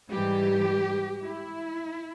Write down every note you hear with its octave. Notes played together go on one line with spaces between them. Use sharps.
G#2 E3 G3 G4
E4